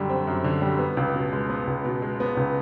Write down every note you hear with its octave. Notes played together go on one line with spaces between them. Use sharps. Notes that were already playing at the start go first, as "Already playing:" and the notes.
Already playing: F#2 D3 G3
C4
F#2
D3
G3
B3
C#2
B2
G#3
B3
C#2
B2
G#3
B3
C#2